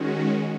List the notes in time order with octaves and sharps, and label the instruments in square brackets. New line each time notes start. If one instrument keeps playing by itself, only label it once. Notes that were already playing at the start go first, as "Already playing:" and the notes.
Already playing: [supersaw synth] D#3 G#3 C#4 F#4